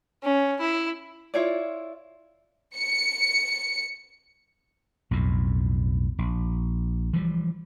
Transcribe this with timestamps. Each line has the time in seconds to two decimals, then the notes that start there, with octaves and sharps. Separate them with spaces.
0.23 C#4
0.60 E4
1.34 E4 F4 C#5 D5
2.77 C#7
5.11 B1 F2 A2
6.18 A#1
7.14 E3 F3 G3